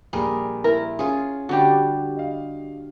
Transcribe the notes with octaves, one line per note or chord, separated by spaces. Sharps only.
A#1 G3 G#4 A#4
E4 A#4
C#4 F4 G#4
D3 G3 D4 F#4 G4
D#5 F5